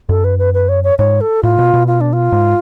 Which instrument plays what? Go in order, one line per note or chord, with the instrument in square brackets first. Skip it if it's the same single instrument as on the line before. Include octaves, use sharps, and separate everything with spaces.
[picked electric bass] F#2 [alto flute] A4
[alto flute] B4
B4
B4
C#5
C#5
[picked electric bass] G#2 [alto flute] C#5
[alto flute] A4
[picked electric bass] A2 [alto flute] F4
[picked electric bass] B2
B2
[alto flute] F4
D4
F4
[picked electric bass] G#2